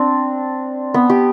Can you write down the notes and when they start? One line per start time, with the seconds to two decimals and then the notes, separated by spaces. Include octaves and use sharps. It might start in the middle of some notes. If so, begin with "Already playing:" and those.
Already playing: C4 D4
0.94 B3
1.10 G4